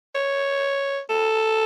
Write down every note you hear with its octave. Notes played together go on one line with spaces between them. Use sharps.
C#5
A4